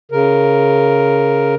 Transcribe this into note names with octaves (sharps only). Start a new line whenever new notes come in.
C#3 A#4